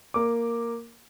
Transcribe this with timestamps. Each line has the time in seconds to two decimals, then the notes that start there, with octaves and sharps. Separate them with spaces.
0.14 A#3 D6